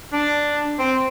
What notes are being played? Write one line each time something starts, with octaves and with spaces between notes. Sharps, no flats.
D4
C4